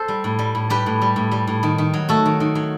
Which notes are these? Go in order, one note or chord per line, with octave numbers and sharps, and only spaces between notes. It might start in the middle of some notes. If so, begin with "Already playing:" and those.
Already playing: A4 C5
G3
A2
G3
A2
G3 G4 B4
A2
G3
A2
G3
A2
D#3
D#3
F#3
A3 F#4 A4
D#3
D#3
F#3